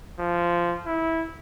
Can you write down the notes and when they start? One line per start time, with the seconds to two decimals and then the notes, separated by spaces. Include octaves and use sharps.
0.20 F3
0.86 E4